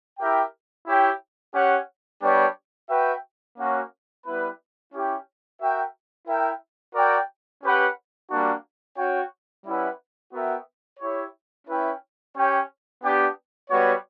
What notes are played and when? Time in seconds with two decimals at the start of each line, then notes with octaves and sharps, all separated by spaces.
0.18 E4 G4 A#4 E5 G5
0.86 E4 G4 C#5 G5
1.53 C#4 G4 C#5 F#5
2.22 G3 B3 D4 G4 C#5
2.89 F#4 B4 E5 G5
3.56 A#3 C#4 F#4 C#5
4.25 G3 B3 E4 B4
4.92 C#4 E4 G4
5.59 F#4 A#4 E5 G5
6.27 E4 A#4 E5 G5
6.94 F#4 A#4 D5 G5
7.62 C#4 G4 B4 F#5
8.29 G3 A#3 D4 F#4
8.96 C#4 F#4 C#5 G5
9.64 G3 C#4 E4 B4 F#5
10.32 B3 F#4 A#4 E5 G5
10.99 E4 G4 C#5
11.67 C#4 E4 B4 E5 G5
12.35 C#4 G4 C#5 G5
13.03 B3 D4 G4
13.69 G3 B3 F#4 C#5